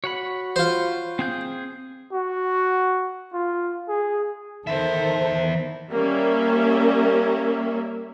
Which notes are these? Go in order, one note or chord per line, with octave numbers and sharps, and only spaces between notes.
F#4 C#5 F#5 B5
F4 C5
C4 G#4 G6
F#4
F4
G#4
E2 D#3 A4 C5 E5
G3 A#3 C#4 A#4 E5